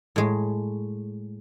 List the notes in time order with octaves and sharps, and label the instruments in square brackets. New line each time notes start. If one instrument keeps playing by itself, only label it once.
[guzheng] A2 G#3